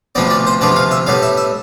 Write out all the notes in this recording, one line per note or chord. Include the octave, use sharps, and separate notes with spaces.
D2 C3 F3 B3 D5
D5
C5
D2 C3 F3 B3 D5
F5
E5
A2 G3 B3 F5
E5
E5